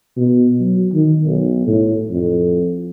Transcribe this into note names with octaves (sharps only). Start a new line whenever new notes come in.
B2
F#3
D#3
B1
A2
F2